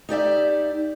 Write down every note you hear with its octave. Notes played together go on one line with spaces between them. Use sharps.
D#4 G4 D5 E5